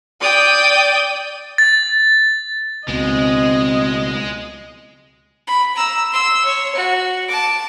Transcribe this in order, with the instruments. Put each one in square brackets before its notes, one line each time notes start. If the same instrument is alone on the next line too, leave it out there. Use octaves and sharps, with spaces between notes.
[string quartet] D5 G5 D#6
[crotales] A6
[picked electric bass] C#2 B2 [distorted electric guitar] G#3 [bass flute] C4 [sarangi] D#5
[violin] B5
A#5 E6
C6 E6
C#5
F#4
A5 D6